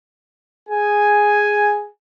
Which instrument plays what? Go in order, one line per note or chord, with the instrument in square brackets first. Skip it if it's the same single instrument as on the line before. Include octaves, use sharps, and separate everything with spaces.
[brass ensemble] G#4 G#5